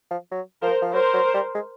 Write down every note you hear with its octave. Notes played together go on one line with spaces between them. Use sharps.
F3
F#3
F3 A#4 C5
F3
F#3 A#4 C5
F#3
G3
G#3